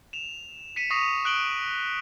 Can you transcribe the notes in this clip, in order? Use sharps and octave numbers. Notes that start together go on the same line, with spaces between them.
E7 F7
B6 C#7 D#7 E7
C#6 D#6 A#6 C7 D#7 F7
D#6 F#6 D7 F#7 G7